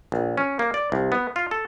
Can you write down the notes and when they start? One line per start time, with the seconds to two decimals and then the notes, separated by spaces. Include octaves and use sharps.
0.12 A#1
0.38 C#4
0.59 A#3
0.74 D5
0.92 C2
1.12 B3
1.36 F4
1.51 A4